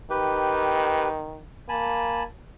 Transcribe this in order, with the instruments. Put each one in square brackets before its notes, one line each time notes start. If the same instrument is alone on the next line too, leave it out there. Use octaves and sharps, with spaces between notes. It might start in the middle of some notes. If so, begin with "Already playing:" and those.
[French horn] D#3 [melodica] G4 B4
[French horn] A#3 [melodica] G#5 A5 B5